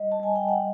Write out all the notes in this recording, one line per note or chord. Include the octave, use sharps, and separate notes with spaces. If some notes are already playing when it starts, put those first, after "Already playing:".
Already playing: G3 D#5
A5
G3 G#5
G5
F#5